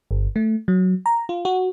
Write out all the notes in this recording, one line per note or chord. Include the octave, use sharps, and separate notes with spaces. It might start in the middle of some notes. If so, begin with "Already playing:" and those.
G1
A3
F#3
A#5
F4
F#4